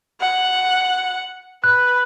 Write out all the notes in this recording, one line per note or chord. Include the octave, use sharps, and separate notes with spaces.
F#5
B4 F#6